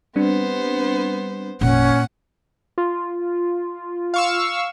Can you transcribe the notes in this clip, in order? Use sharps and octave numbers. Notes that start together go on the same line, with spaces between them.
G3 B3 C4 D4 C5
G#1 F2 A#2 C#4 F#5
F4
F5 C#6 E6